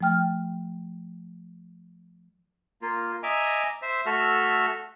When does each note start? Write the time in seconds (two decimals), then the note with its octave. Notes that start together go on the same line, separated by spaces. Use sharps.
0.01 F3 A3 G5 F6
2.82 A#3 F4
3.23 D#5 E5 G#5 A#5 D6
3.82 C5 E5
4.06 A3 F#4 A4 E5 F6